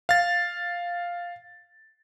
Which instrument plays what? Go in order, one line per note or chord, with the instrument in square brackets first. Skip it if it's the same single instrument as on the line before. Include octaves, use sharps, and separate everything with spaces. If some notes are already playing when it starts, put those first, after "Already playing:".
[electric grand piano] F5 A6